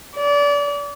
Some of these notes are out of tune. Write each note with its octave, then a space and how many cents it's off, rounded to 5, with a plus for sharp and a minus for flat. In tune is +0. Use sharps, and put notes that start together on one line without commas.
D5 -30